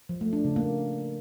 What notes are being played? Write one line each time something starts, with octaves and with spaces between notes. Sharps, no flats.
F3
A3
D4
C#3
A#3